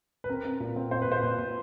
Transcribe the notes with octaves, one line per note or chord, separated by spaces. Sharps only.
B4
C4 A#4
C4
A#2
C4
A#2 C5
B4
A#2 C5
A#2
A#2